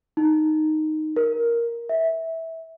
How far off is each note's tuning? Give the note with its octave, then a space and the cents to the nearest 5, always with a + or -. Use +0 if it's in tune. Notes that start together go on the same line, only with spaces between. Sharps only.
D#4 -5
A#4 +5
E5 -15